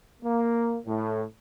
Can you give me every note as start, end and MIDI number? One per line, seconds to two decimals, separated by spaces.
0.23 0.77 58
0.86 1.24 45